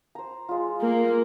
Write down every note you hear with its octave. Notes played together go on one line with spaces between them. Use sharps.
C5 A#5
G#3 F4
A#3